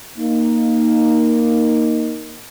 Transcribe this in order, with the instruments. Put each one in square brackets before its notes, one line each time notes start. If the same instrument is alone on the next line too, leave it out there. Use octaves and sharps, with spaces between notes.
[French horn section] A#3 D#4